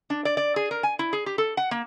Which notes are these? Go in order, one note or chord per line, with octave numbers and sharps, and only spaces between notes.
D4
D5
D5
G#4
A#4
G#5
E4
G#4
G4
A4
F#5
A#3